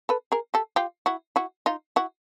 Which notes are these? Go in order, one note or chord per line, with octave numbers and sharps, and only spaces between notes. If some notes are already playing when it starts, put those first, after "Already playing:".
A4 B4
G#4 A#4
G4 A4
F4 G4
E4 F#4
E4 F#4
D#4 F4
E4 F#4